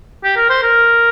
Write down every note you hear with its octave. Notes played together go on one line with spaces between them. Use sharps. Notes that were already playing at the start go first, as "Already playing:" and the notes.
G4
A#4
C5
A#4